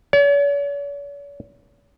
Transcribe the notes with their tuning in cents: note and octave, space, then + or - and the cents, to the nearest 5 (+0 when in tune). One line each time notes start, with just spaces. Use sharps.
C#5 +45